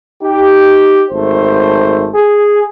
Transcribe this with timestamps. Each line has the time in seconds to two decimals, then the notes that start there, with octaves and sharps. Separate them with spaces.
0.23 D#4 G4
1.10 G#1 A3 C5
2.14 G#4